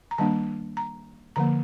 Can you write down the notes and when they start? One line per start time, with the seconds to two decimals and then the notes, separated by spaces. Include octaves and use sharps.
0.11 A#5
0.18 D#3 G3 A#3 D4 A5
0.77 A#5
1.36 D3 F3 A#3 A#5